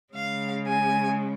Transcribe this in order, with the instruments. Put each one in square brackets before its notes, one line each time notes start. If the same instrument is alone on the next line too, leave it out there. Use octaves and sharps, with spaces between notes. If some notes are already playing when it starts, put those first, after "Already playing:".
[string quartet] C#3 G#3 F5
G#5